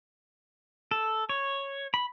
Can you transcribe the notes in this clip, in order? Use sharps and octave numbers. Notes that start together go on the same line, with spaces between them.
A4
C#5
B5